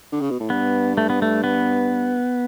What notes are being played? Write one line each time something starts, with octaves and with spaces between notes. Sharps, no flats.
D3
C#3
B2
A2
G2 B3
A3
B3
A3
B3